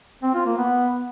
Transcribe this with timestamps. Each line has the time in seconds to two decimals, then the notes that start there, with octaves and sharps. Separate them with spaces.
0.23 C4
0.34 F4
0.46 A#3
0.57 B3